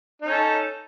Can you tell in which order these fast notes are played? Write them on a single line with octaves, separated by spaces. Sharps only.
D#4 C#4 A4